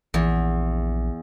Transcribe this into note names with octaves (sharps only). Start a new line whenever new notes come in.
A#1 E2